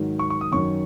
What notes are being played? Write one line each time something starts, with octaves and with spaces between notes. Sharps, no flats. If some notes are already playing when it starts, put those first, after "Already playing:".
Already playing: G#2 D#3 F#3
C#6
C#6
D#6
F#2 D#3 F#3 C#6